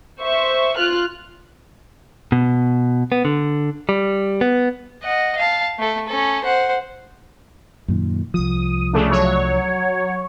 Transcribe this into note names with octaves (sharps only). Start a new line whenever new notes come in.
C5 E5 C#6
F4 F6 F#6
B2
B3
D3
G3
B3
D#5 F#5
F5 A5
A3 A4
C#4 A4
C5 F#5
F#2 A#2 D#3
C2 F3 D#6
C#3 A3 D4
F#3 C#5